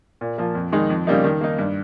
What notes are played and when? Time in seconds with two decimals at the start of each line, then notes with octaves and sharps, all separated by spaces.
0.21 A#2
0.38 F3 A#3
0.55 F2
0.72 D#3 G#3 D#4
0.90 F2
1.07 C#3 G3 A#3 D#4
1.24 D#3
1.41 A#3 D#4
1.58 G2